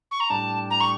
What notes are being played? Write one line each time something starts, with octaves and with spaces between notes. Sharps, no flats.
C#6
A#5
A2 G3 D4 A5
A#5
C#6